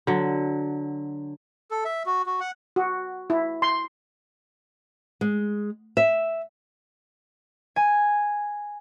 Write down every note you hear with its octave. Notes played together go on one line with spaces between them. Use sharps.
D3 F#3
A4
E5
F#4
F#4
F#5
F#4
E4
C6
G#3
E5
G#5